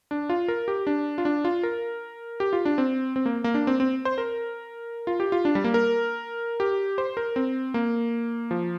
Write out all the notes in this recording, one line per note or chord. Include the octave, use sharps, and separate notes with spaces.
D4
F4
A#4
G4
D4
F4
D4
F4
A#4
G4
F4
D4
C4
C4
A#3
A#3
D4
C4
C4
C5
A#4
F4
G4
F4
D4
G3
A#3
A#4
G4
C5
A#4
C4
A#3
F3